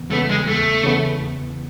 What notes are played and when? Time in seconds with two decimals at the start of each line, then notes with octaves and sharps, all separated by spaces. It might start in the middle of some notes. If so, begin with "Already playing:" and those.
Already playing: E2 C#3 E3 B3
0.11 C#3 E3 A3 B3
0.29 G#3
0.47 E2 A3
0.84 C#3 E3 B3
1.21 E2